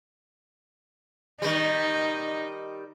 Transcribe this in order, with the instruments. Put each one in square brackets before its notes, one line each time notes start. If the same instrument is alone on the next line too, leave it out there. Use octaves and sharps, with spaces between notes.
[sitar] D#3 G3 [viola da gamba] D#4